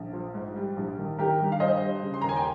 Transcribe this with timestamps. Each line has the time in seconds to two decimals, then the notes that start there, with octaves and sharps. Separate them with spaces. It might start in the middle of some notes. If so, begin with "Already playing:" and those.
Already playing: A#1
0.13 F3
0.34 G#2
0.56 G3
0.77 A#1
0.98 D#3
1.19 D#3 G4 A#4
1.40 G2
1.52 F5
1.60 G2 C5 D#5
1.82 G3
2.03 C#3
2.14 C6
2.22 D#2 A#5
2.29 G#5
2.36 G5